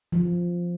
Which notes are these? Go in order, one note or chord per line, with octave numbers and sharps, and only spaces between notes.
F3